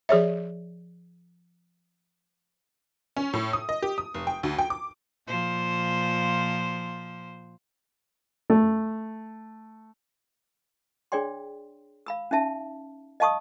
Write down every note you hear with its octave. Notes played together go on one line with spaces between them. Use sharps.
F3 G#4 C#5 E5
C#4
A2
D#6
D#5
G4
D#6
F1
G5
D2
G5
D6
A#2 F3 C5
A3
D4 G#4 C#5 D5 G5 C6
F5 B5 E6
C#4 D#4 E5 A5
D#5 F5 A5 C#6 D#6